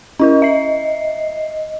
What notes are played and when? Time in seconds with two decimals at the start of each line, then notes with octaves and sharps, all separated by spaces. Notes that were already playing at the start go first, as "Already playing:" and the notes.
0.20 C#4 E4 A#4 D#5
0.42 E5 C7